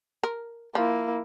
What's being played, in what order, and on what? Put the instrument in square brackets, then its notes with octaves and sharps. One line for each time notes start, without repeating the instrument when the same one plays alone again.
[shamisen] A#4
[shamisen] F3 [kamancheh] A#3 E4